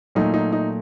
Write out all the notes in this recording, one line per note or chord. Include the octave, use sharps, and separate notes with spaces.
A#2 F#3 A3 D#4
D#4
D#4